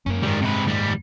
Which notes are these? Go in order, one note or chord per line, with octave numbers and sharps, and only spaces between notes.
F#2 G#3 A#3 C#4
G#2 D#3 G3
C3 B4
D#2 G3